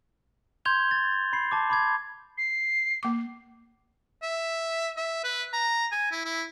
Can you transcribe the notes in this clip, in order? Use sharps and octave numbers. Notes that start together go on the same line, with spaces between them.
C6 G6 G#6 F7 G7
A6
B5 A6 C7
A5 D6
B5 D6 G#6
C7
A#3 D6
E5
E5
B4
A#5
G#5
E4
E4